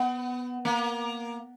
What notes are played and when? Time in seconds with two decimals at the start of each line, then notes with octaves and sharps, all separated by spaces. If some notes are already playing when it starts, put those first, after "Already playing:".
Already playing: B3
0.65 A#3